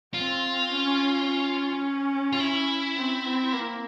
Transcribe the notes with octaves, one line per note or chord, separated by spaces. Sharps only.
C4 F4
C#4
C#4
F4
E4
C4
C4
A#3